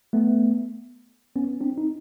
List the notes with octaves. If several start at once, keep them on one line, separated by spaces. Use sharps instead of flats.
A3 B3
B3 C#4
C4 D4
D#4